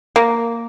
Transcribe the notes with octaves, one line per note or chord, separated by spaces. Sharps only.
A#3